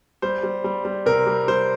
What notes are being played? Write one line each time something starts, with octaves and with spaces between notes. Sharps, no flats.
G3 C5
G3
G3
G3
C3 A#4
G3
G3 C5